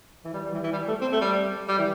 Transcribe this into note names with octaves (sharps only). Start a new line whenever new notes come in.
E3
G3
G3
E3
E3
G3
A3
C4
A3
G3
G3
E3